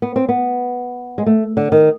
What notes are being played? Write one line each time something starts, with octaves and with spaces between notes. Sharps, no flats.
B3
C4
B3
G#3
A3
D3
D#3